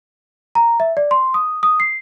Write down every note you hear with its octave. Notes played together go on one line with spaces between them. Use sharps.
A#5
E5
D5
C6
D#6
D#6
C7